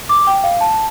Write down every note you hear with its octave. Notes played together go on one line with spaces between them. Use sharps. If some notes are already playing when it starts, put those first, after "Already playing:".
D6
G5
F5
A5